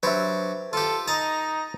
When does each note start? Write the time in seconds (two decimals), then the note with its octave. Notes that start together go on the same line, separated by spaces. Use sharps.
0.03 F#3 D4 G4 B4 C5 E5
0.73 F4 G4 A4
1.08 D#4 D#5 A5 A#5